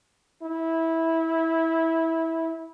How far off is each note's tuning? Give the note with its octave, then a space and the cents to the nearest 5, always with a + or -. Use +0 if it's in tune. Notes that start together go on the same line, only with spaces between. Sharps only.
E4 -15